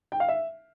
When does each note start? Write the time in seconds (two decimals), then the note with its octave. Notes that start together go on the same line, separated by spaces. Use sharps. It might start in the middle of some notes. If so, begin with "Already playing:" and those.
0.12 G5
0.20 F5
0.28 E5